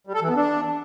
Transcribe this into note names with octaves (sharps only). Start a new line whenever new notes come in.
G3
A4
E3
B3
D4